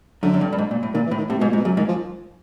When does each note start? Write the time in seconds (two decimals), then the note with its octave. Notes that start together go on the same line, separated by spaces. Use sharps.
0.23 F#2 D3
0.34 F#2
0.41 G2
0.53 G2
0.58 G#2
0.71 A#2
0.83 A2
0.94 A#2 D#3
1.06 E3
1.11 A2
1.18 D#3
1.29 A2 C3
1.39 B2
1.41 G#2
1.48 A#2
1.53 G#2
1.57 B2
1.65 F#2 C#3
1.77 G#2 D#3
1.88 F3